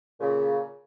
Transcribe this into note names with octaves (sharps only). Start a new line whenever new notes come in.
A#2 C#3